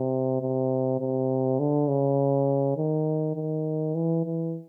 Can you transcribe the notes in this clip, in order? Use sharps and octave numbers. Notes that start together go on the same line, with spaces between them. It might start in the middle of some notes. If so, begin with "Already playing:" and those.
Already playing: C3
C3
C3
D3
C#3
D#3
D#3
E3
E3